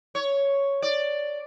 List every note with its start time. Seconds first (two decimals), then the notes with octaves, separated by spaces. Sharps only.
0.15 C#5
0.82 D5